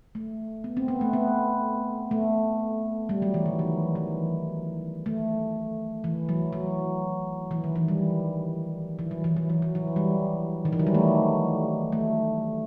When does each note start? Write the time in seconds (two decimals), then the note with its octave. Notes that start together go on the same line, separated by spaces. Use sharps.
0.15 A3
0.64 B3
0.77 C4
0.88 B3
1.01 A3
1.13 B3
2.11 A3
3.09 G3
3.22 F#3
3.34 E3
3.46 D#3
3.59 E3
3.95 E3
5.06 A3
6.04 E3
6.29 F#3
6.53 F#3
7.51 E3
7.64 D#3
7.76 E3
7.88 G3
8.99 E3
9.11 F#3
9.24 E3
9.37 F#3
9.50 E3
9.62 F#3
9.75 E3
9.96 G3
10.65 D#3
10.73 E3
10.80 F#3
10.87 G3
10.95 A3
11.92 A3